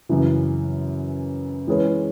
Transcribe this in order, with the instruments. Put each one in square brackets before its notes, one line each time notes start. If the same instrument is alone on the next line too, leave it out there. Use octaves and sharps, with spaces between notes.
[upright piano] F#2 C#3 E3
E3 G#3 C#4 G#4 B4